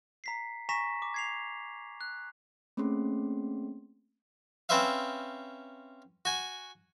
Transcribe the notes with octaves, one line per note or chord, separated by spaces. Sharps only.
A#5 B6 C7
G#5 A#5 C#6 A#6 B6 E7
D6
G#6 C7 F7
F#6
A3 A#3 C4 C#4 G#4 C6
C4 C#4 B4 C5 E5 F5
F#4 G#5